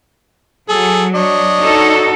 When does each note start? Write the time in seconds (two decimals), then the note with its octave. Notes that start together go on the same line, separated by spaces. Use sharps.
0.69 F#3 G#4 A4
1.15 D4 C#5 D#5
1.61 D#4 F#4 A4